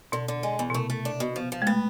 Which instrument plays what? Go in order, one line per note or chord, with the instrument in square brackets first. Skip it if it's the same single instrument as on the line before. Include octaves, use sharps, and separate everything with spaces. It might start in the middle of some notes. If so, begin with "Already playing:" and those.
[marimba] B2 [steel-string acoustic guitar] D3
[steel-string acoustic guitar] D3
G#3
E2
[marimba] B2
[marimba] C3 [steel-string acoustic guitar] A3
[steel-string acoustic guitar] A3
D4
B2
F3
F3
[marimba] G#3
[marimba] A3 [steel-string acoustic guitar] B3